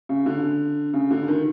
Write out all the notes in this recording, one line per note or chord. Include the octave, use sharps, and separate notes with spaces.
C#3
D3
C#3
D3
D#3